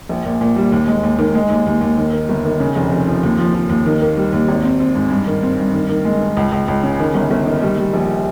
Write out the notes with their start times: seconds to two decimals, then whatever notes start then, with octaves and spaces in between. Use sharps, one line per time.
0.09 A#1
0.25 A#2
0.41 A#2
0.56 G3
0.72 D#2
0.88 G#3
1.03 D#2
1.19 D#3
1.35 G#3
1.50 D#2
1.66 D#2
1.81 D#2
1.98 D#3
2.12 D#3
2.29 G1
2.45 D#3
2.60 C#3
2.76 F1
2.91 F1
3.07 F3
3.23 D#2
3.38 F3
3.54 F3
3.69 D#2
3.86 D#3
4.01 A#3
4.17 G3
4.33 D#2
4.48 G#1
4.64 C4
4.80 C4
4.95 G#2
5.10 G2
5.27 D#3
5.43 C4
5.58 G2
5.74 D#3
5.89 D#3
6.05 G#3
6.20 D#3
6.37 C#2
6.52 C#2
6.68 C#2
6.83 C#3
7.00 D#3
7.15 G1
7.31 G1
7.46 D#3
7.62 G3
7.77 G3
7.93 A#1